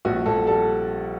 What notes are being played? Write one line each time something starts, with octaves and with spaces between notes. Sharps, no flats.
A#1 F#4
A#1 A4
G3 A4